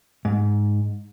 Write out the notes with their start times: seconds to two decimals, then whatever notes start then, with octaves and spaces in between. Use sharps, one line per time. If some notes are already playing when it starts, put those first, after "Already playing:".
0.25 G#2